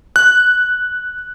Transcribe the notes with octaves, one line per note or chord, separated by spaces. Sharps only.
F#6